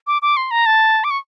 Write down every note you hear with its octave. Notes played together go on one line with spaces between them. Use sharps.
D6
D6
C6
A#5
A5
D6
C#6